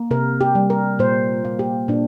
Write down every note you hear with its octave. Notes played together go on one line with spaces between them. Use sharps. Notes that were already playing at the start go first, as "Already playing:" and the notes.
Already playing: A#3
C3 A#4
G4
G3
A#4
A#2 C5
A#3
G4
A#2 D4